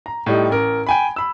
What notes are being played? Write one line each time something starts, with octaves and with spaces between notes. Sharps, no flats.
A#5
A2 G3 D#4
A1 A#4
G5 G#5 B5
B5 E6